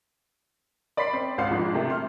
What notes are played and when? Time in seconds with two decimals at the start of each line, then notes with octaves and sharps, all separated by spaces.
0.97 D5 B5 C6 B6 C7
1.13 C4
1.38 G#1 C#2 C5 F5 F#5 C7
1.51 G#2 F3 G#3 D4
1.74 C3 A3
1.90 C6 F6